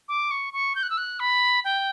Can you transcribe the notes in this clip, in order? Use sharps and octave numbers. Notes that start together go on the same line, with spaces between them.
D6
C#6
C#6
G6
F#6
E6
F#6
B5
G5